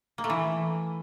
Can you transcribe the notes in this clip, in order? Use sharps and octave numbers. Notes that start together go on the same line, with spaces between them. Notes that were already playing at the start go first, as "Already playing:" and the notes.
A#3
A3
E3